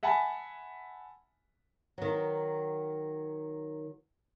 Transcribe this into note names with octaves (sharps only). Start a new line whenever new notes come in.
E5 F#5 G#5 A5 B5
D#3 F#3